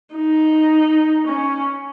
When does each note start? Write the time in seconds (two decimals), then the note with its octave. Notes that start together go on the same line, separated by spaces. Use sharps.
0.15 D#4
1.27 C#4